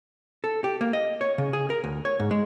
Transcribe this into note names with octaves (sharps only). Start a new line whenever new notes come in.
A4
G4
A#3
D#5
C#5
C#3
G#4
A#4
D2
C#5
G#2
G#3